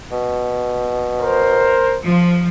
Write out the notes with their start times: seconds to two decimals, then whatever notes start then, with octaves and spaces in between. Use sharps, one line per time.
0.12 B2
1.20 A#4 C5
2.04 F3